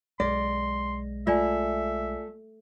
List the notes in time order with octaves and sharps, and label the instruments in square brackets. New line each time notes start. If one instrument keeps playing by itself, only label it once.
[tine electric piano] B1 G#3 A#6 [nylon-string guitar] D5 [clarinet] C6
[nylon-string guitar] A3 [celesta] F4 D5 G#5 [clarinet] E5